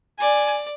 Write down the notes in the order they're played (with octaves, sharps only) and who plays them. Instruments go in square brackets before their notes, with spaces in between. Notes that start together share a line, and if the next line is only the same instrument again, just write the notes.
[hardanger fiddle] D5 [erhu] G#5